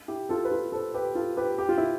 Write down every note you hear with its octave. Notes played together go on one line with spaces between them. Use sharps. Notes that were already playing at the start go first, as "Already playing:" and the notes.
E4 G4
F4 A4
B4
F4 A4
A4 C5
G4 B4
F4 A4
G4 B4
G4
F4
E4